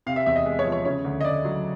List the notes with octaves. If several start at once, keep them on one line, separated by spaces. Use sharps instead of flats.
C3 F5
E5
E2 E5
D#5
G#3
C#5
F3
C#5
C#3 C#5
D2
D#5
D2 D5
F#3